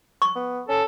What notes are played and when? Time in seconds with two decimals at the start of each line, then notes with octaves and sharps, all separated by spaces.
0.22 C#6
0.35 B3
0.69 C#4 A4